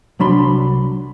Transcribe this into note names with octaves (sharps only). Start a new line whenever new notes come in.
C2 F#3 D4 B5 C6